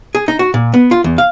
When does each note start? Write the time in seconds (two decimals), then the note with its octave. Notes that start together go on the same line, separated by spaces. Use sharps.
0.15 G#4
0.28 D#4
0.39 F#4
0.54 A#2
0.74 B3
0.91 F4
1.04 E2
1.18 F5